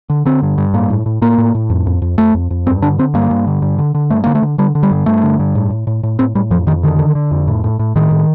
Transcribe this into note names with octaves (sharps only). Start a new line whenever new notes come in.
D3
D3 C4
G2
G2
A2 A#3
A2
A2
A2 A#3
A2
A2
F2
F2
F2
F2 A3
F2
F2
G2 C4
D3 D4
D3 C4
G2 A#3
G2
D3
G2
D3
D3
G2 A3
D3 A#3
A3
D3
D3 G3
D3
G3
G2
G2 A3
D3
G2
A2
A2
A2
A2
A2 C4
A2 G3
F2 F3
F2 D#3
D3 D#3
D3
D3
F2
A2
A2
A2
A2 D#3
A2